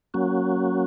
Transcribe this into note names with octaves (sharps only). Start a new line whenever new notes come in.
F#3 A#3 C#4 F#4